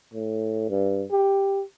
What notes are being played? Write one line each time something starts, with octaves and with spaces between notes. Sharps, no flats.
A2
G2
G4